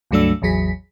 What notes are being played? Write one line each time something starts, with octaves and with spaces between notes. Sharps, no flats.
C#2 G2 F#3 A3 D4 E6
A1 E2 F#3 G#4 B6